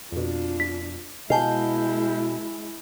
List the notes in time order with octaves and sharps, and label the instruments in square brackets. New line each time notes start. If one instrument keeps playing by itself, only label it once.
[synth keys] F2 B2 [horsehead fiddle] D4 F4
[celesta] B6
[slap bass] B2 [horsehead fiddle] G#3 E4 [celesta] D#5 G#5 A5 [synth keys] F5 G6